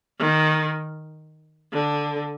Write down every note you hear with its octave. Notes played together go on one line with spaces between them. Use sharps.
D#3
D3